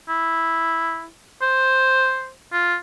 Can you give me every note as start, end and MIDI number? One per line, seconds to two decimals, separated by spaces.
0.09 1.06 64
1.42 2.30 72
2.53 2.76 65